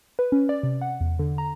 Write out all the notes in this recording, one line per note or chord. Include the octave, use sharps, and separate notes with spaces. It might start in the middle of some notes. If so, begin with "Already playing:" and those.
B4
C#4
D5
C3
F#5
E2
D3
A#5